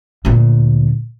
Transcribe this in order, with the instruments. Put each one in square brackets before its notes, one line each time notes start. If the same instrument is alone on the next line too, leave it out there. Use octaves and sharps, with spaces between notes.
[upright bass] D2 A#2